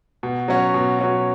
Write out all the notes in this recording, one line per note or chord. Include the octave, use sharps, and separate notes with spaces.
B2
F#3 C#4 F#4
B2
F#3 C#4 F#4